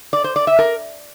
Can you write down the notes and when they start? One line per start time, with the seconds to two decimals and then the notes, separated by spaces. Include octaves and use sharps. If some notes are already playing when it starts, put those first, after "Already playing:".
0.13 D5
0.24 C5
0.36 D5
0.47 E5
0.59 A#4